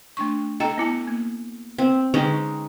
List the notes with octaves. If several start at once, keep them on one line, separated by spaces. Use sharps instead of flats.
A3 D4 C#6
A4 D#5 G5 A#5
B3 E4 G#5
A#3
C4
D3 G#3 C#4 D#4 B4 G5